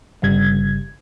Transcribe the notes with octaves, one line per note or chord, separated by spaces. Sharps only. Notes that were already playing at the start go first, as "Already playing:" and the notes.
G1 C#3 G3 G#6